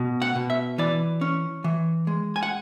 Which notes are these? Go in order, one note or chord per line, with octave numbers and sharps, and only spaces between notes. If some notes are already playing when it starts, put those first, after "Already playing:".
Already playing: B2
F#5
B2
E5
E3 D5
C#4
E3
G#3
G#5
F#5